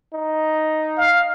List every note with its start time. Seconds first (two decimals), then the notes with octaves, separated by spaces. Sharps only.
0.13 D#4
0.97 F5